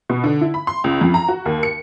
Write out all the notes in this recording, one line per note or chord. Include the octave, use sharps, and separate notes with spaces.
B2
D3
E4
B5
C6
C#2
F2
A#5
F#4
D#2
C#7